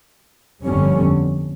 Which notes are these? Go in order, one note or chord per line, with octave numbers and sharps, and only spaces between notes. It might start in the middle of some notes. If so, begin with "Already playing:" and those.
G1 F2 D3 G3 C#4